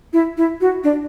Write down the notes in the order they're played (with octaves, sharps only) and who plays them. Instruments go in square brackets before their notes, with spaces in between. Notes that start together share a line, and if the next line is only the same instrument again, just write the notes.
[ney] E4
E4
F#4
D4